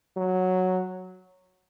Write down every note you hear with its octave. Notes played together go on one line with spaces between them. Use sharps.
F#3